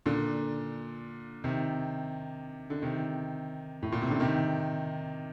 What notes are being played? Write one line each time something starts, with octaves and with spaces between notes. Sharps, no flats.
A#2 D3
C3 D#3
D3
C3 D#3
A2
A#2
C3
D3
C3 D#3